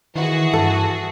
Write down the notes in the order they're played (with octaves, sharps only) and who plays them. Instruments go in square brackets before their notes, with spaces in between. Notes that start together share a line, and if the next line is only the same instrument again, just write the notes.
[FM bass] D#3 [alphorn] E3 [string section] F#4 G#4
[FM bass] G2 [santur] A4